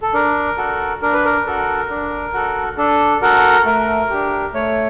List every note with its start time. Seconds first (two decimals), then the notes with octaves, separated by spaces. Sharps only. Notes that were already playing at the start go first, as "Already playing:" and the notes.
0.02 A4
0.14 D4 A#4
0.58 F#4 A4
1.02 D4 A#4
1.13 B4
1.25 A#4
1.46 F#4 A4
1.90 D4
2.34 F#4 A4
2.77 D4 A4
3.22 F#4 A4 A#4
3.66 A3 A#4
4.10 D4 G4
4.54 A3 C#5